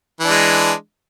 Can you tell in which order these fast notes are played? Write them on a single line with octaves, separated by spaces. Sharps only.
E3 D4 G#3